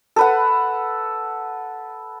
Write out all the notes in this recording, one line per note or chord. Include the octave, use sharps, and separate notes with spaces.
A4 B4 F#5